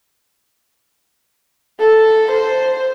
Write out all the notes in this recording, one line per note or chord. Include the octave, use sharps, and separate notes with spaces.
A4
C5